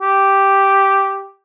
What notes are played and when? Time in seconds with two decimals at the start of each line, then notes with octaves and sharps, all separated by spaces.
0.02 G4